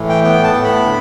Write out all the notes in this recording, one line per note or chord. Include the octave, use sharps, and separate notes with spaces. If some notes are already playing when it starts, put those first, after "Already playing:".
Already playing: A2 E3
G5
B3 G5
A5
A2
B5
D3